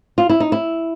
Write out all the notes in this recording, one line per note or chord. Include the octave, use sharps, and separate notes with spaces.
F4
E4
D#4
E4